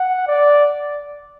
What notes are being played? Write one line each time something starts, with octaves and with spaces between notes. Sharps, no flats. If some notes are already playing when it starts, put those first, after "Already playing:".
Already playing: F#5
D5